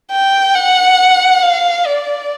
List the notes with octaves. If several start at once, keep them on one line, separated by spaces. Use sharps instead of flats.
G5
F#5
F5
D5